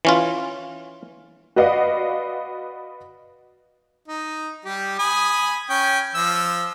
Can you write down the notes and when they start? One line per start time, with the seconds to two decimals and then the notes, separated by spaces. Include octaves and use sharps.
0.05 E3 C#4 F4
1.56 F#4 B4 D5 D#5 F5 F#5
4.08 D#4
4.65 G3 G4
4.99 G#5 B5 D#6
5.70 C#4 G5
6.15 F3 E6